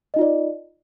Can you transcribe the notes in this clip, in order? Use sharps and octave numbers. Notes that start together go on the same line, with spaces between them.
D#4 F4 D5 D#5